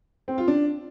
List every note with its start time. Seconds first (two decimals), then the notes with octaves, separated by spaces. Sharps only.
0.28 C4
0.38 F4
0.48 D4